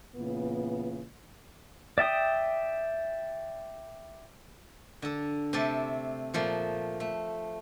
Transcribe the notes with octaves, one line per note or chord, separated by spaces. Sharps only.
A#2 C#3 E3 B3
D5 E5 G5 D#6
D3 A4
C3 A3 G4 A4 D5
A#2 F3 A3 A#3
A3